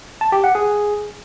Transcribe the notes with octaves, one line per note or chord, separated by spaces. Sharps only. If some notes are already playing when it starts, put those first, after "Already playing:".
A5
G4
F#5
G#4